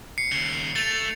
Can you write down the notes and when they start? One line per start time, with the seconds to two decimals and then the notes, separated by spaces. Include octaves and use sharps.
0.18 C7 C#7
0.32 D#2 C#3
0.76 A3 A6 F7